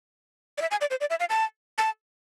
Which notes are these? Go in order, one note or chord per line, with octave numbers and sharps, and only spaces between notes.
D5
E5
G#5
D5
C5
D5
E5
F5
A5
A5